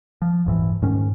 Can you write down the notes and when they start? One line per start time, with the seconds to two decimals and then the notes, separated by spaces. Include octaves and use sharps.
0.22 F3
0.46 D#1 G#2 E3
0.82 G#2 D#3 C#4